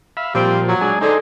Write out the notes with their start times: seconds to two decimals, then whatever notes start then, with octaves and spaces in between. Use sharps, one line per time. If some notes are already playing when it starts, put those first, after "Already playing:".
0.17 E5 F5 B5
0.35 A#2 F3 G3 C4
0.67 F#3
0.81 G#3 D4 G#4
1.01 D3 D#4 G#4 C5